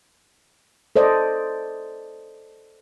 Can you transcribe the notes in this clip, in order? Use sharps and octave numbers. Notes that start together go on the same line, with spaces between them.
A4 C5 D5 D#5